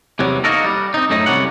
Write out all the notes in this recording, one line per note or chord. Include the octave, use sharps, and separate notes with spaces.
E2 C3 F#3 G3
A#3 D#4 F#4 A4 A#4
G3
C4 D#4
F#2 A2 A3 D#4
C2 D#3 F#3 G3 C#4 F#5